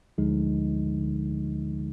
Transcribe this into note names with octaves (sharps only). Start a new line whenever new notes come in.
D2 D3 F3 G#3 D#4
D3